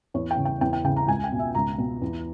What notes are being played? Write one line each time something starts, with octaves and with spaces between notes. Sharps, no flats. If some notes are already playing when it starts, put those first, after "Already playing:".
E2 C#5
G5
C#3
G5
E2 G5
G5
C#3 G5
A#5
C#2 G#5
G5
B2
E5
C#2 A#5
B2
E2